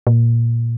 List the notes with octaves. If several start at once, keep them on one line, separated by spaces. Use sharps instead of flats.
A#2